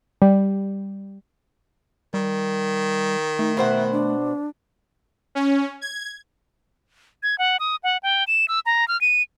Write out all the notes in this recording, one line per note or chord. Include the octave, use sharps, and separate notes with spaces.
G3
D#3 G3
A3 D#4
B2 C5 E5 F#5
D4
C#4
G#6
G#6
F#5
D#6
F#5
G5
E7
E6
A#5
F6
D#7